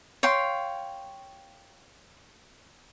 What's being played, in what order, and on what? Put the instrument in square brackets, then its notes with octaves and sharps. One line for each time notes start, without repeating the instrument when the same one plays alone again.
[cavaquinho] C#5 F5 G5 C6